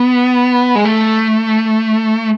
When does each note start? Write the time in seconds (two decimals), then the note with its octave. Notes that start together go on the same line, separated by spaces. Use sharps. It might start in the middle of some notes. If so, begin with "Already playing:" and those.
Already playing: B3
0.75 G#3
0.85 A3